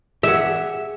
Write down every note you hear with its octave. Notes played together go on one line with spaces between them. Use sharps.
G4 G#4 E5 F#5